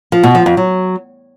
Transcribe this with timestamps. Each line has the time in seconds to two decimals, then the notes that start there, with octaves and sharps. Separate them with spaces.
0.12 F3
0.23 B2
0.35 F3
0.46 F2
0.57 F#3